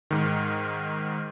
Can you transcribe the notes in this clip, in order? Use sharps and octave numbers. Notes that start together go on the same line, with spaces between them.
G#2 D#3